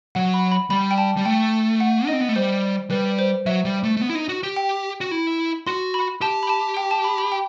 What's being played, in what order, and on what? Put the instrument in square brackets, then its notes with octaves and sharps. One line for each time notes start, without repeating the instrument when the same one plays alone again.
[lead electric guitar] F#3 [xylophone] F#5
[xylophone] B5
B5
[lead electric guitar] G3 [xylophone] B5
[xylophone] G5
A5
[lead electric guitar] G3
[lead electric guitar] A3 [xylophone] G5
[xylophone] F#5
[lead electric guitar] D#4
[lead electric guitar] C4 [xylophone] D#5
[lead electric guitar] B3
A3
[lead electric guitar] G3 [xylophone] C5
[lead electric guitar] G3 [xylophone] B4
[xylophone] C5
[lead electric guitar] F#3 [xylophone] E5
[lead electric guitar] G3
A3
A3
B3
E4
D#4
F#4
G4
[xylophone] G5
[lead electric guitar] F#4
E4
[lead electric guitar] F#4 [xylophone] C6
[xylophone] B5
[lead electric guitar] G4 [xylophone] A5
[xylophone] B5
A5
G5
A5
B5
B5
G5